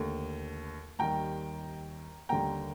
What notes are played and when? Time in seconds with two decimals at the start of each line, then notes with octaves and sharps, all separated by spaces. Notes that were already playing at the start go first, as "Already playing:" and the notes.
Already playing: D#2 D3 A3
0.99 D#2 D#3 G3 G5 A#5
2.29 D#2 D3 G3 A#3 G5 A#5